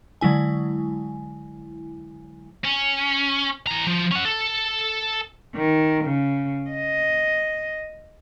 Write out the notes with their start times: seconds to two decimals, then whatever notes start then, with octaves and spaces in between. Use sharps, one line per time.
0.21 D3 F#3 G#3 E4 G#5
2.65 C#4
3.67 E3 A#5
3.87 F3
4.12 C#4 F#5
4.25 A4
5.55 D#3
6.04 C#3
6.70 D#5